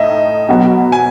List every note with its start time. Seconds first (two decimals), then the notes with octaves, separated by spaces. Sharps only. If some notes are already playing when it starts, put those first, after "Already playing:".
Already playing: A2 D#4 D#5 E5
0.49 B2 F#3 B3 F#4
0.92 G#5